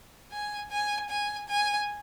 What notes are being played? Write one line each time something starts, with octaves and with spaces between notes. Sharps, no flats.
G#5
G#5
G#5
G#5